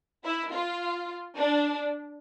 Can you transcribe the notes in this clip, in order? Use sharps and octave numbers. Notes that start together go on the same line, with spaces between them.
E4
F4
D4